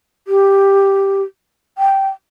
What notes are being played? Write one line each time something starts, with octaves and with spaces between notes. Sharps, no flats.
G4
G5